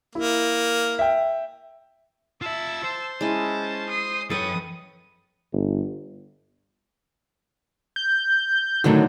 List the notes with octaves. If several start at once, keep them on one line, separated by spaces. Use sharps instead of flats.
A#3 E4
E5 G5
F4 E5 A5 E6
C5
G#3 C#4 E4 A5
D#6 C7
F#2 A4 B4 C#5 G5 D#6
G1
G6
A2 D3 D#3 F#3